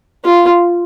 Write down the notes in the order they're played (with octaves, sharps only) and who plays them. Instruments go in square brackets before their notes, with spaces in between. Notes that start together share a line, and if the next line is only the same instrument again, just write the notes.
[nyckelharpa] F4